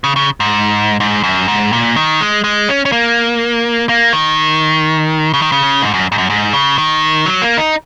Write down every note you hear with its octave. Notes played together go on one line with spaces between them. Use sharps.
C#3
C#3
G#2
G#2
F#2
G#2
A#2
D#3
G#3
G#3
C#4
C#4
A#3
A#3
D#3
C#3
D#3
C#3
G#2
F#2
G#2
F#2
G#2
C#3
D#3
F#3
A#3
D#4